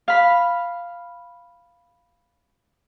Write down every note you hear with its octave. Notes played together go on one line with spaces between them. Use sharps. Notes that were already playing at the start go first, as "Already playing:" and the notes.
F5 B5